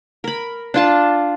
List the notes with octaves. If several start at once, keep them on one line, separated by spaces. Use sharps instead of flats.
A#4 B5
D4 F4 A5